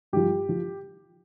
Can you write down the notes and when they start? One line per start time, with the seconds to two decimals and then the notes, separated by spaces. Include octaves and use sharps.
0.13 G2 F3 G4
0.49 F3